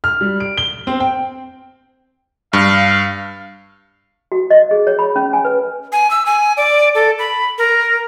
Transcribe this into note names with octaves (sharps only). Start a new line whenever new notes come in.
F6
G3
D7
G7
C4
G5
G2 F5
F#4
D#5
G#4
C#5
B5
C#4
G#5
B4
G#5
E6
G#5
D5
A4
B5
A#4